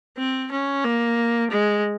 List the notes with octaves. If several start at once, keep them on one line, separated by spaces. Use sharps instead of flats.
C4
C#4
A#3
G#3